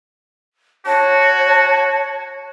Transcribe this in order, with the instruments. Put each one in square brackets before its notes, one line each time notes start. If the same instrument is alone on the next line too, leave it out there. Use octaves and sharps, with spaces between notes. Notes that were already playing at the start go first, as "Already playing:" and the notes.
[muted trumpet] F#4 [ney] C#5 [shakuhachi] A5